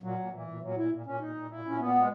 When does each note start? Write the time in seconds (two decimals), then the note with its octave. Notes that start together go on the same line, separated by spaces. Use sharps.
0.03 A#2 F#3
0.18 A#2
0.32 A#2 E3
0.47 A#2
0.61 A#2 F#3
0.77 A#2 E4
0.91 A#2
1.06 A#2 C#4
1.20 A#2 D#4
1.35 A#2
1.50 A#2 E4
1.65 A#2 C#4
1.79 A#2 B3
1.95 A#2 G#3